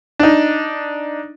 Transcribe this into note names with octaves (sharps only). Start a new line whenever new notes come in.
D4 D#4